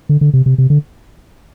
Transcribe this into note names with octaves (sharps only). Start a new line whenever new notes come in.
D3
D3
C3
C3
C3
D3